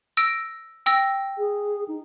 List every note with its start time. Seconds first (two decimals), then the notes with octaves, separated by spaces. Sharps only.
0.17 E6 A#6 D7
0.86 G5 E6 A#6
1.38 G#4
1.88 D#4